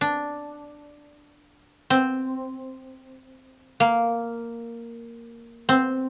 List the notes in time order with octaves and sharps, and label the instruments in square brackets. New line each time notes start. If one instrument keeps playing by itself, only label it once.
[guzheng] D4
C4
A#3
C4